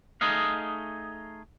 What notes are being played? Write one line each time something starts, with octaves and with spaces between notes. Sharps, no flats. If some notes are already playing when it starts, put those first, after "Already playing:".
A3 D#4 G#4 D#5 F5